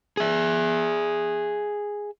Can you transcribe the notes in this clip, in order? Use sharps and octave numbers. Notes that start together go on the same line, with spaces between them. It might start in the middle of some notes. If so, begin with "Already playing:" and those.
G#4 E5